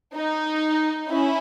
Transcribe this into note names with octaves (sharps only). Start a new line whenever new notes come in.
D#4
C#4 E4